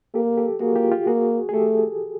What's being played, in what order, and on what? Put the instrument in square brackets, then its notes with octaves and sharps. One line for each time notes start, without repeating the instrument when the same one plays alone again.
[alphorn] A#3 [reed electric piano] G4 A4
[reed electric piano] G4 A4
[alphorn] A#3 [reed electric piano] F#4 G#4
[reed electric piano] F4 G4
F4 G4
[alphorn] A#3 [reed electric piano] F#4 G#4
[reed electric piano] G#4
[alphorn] A3 [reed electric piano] G4 A4